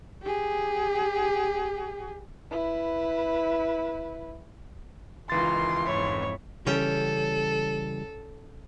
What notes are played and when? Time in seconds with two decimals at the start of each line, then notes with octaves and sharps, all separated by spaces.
0.23 G4 G#4
2.51 E4 B4
5.30 C#2 D#3 E3 F4 A#4 C6 A6
5.87 F2 G#2 E4 C#5
6.67 C#3 E3 G3 C#4 A4 G5